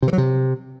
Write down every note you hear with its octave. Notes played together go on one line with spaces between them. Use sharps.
C3
E3
F#3
C3